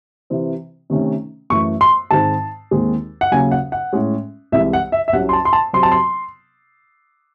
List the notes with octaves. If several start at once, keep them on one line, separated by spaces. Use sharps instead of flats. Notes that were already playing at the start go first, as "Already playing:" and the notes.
C3 E3 C4
C3 D#3 A3 C#4
F#2 E3 A3 C#6
C6
G#2 D#3 G#3 C4 A5
D#2 D#3 G#3 C4
F#5
D#2 C#3 F#3 C#4 G#5
F#5
F#5
A2 G#3 C#4
C2 C3 E3 G#3 E5
F#5
E5
E5
C2 C3 F#3 C#4 F#5
C6
A5
C6
A5
C3 F#3 C4 C6
A5
C6